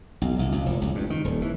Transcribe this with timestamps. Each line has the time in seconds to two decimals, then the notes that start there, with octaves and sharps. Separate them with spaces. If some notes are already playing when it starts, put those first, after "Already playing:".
0.21 B1
0.39 C2
0.52 C#2
0.66 F1
0.82 C#2
0.95 G2
1.10 D#3
1.24 D#1
1.42 E3